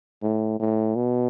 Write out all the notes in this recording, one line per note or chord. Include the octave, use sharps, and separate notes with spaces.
A2
A2
B2